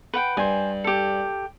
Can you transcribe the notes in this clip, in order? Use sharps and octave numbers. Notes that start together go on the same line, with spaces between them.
B4 F#5 G5
G2 C5 G#5
G4 A4